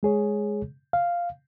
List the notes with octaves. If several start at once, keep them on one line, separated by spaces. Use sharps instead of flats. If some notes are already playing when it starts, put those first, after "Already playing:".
G#3 G#4 C#5
F5